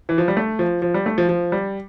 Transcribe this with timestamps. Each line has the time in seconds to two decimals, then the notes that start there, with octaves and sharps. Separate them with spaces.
0.09 E3
0.18 F3
0.28 G3
0.37 A3
0.59 F3
0.82 F3
0.94 G3
1.06 A3
1.18 F3
1.29 F3
1.52 G3